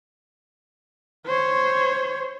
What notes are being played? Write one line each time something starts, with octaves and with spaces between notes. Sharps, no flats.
C5 C#5